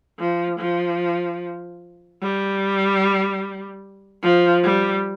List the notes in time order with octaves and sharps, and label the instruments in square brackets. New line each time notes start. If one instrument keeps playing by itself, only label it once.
[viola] F3
F3
G3
F3
G3